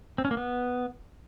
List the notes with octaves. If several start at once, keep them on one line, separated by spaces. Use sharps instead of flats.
C4
C#4
A#3
B3